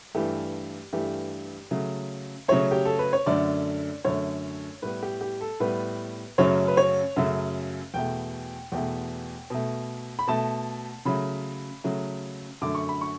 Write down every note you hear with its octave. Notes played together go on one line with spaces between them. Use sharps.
G2 E3 A3 G4
G2 E3 A3 G4
C#3 F#3 A3
C#3 F#3 A3 C#5
G4
A4
B4
C#5
F#2 D3 A3 D5
F#2 D3 A3 C#5
A2 G3 B3 B4
G4
G4
A4
A2 G3 B3 B4
F#2 C#3 F#3 A3 C#5
B4
C#5
F#2 C#3 F#3 A3 E5
E2 B2 A3 G5
E2 B2 A3 G5
B2 A3
B5
B2 A3 A5
C#3 F#3 A3 B5
C#3 F#3 A3
F#2 D3 A3 D6
C#6
B5
C#6